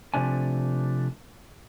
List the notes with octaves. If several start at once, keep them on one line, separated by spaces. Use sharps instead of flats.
C3 F3 A3 D4 G#5